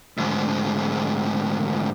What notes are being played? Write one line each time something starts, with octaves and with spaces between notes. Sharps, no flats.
D2 G#2